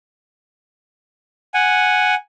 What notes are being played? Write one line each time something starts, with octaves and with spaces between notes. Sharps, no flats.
F#5 G#5